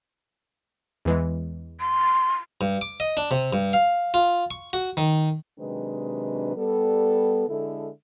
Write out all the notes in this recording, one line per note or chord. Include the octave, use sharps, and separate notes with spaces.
E2 E3 G#3
C6
G2
D6
D#5
D4
C3
G2
F5
F4
C#6
F#4
D#3
C3 D#3 F#3 G#3 D4 B4
G3 B3 A4
D3 G#3 E4 A4